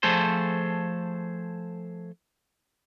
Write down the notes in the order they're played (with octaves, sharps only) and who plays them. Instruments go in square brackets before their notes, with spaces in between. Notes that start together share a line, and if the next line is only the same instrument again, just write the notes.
[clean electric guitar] F3 A3 G#4 A4 C5